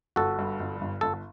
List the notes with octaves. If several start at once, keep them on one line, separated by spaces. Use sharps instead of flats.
G1 F#4 A4
G2
G1
G1
G1 A4